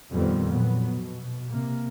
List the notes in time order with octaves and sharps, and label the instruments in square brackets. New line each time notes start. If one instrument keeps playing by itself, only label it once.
[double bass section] F2 A#2 D#3 G3 B3 C4
A#2 F#3 B3
B2
C3 A#3